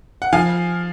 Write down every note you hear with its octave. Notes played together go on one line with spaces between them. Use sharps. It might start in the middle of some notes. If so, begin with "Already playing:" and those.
F#5
F3 F5 G#5